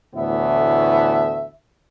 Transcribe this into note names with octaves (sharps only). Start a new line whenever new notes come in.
D2 A2 E3 A3 B3 E5